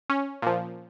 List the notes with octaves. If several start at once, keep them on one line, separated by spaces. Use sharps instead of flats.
C#4
A#2 F3